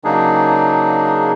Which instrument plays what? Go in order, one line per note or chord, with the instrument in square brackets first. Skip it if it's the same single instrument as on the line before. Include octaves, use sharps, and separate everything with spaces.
[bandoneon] C#3 F#3 A#3 D4 D#4 G#4